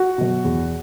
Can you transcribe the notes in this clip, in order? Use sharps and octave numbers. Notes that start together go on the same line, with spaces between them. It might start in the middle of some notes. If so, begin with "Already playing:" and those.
Already playing: F#4
B2 F#3
E2